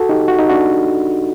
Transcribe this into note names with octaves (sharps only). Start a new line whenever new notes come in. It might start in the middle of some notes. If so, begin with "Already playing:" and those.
Already playing: F#4 A4
D#4 G4
F#4
D#4
D4 F#4